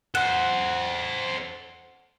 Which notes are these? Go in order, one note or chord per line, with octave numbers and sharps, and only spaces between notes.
A4 C5 F#5